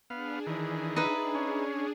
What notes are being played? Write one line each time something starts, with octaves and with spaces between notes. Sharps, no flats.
B3 D4 G#4 F5
D#3 E3
D#4 B4 E5
C#4